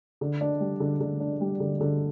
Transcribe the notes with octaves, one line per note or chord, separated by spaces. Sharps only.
D3
D4
G3
D3
D3
D4
G3
D3
D3